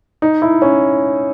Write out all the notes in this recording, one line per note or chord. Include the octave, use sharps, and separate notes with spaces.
D#4
E4
C#4